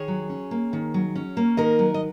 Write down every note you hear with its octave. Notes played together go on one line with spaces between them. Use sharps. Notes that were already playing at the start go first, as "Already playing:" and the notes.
Already playing: D#3 G#4 C#5
F#3
C#4
A#3
D#3
F#3
C#4
A#3
D#3 A#4 D#5
F#3
D#5